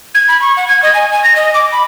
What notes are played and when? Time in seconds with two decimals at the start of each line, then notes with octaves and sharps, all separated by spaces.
0.15 G#6
0.28 B5
0.42 C#6
0.57 F#5
0.68 G#6
0.83 D#5
0.94 G#5
1.12 G#5
1.24 A#6
1.36 D#5
1.54 D6
1.72 B5